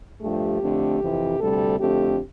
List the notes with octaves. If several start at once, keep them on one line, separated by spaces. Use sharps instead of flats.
G2 F3 A3 G4
F2 D3 A3
F2 C3 E3
D2 C3 G3 A4
F2 D3 A3 G4